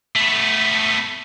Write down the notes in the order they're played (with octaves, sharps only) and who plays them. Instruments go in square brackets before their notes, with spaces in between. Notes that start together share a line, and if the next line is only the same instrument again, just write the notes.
[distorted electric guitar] A3 B3